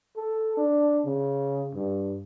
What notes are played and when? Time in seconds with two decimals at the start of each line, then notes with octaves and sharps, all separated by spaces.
0.17 A4
0.57 D4
1.05 C#3
1.74 G2